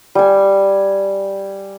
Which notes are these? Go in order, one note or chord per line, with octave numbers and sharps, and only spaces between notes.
G3 G#5